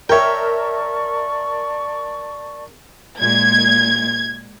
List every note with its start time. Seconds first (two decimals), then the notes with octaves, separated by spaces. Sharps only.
0.09 A#4 C#5 D5 E5 G5 A5 C#6
3.19 A#2 G#3 G#6